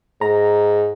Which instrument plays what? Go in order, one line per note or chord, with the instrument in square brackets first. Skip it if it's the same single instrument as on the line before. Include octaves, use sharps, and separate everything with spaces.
[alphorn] G#2 [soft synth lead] A#5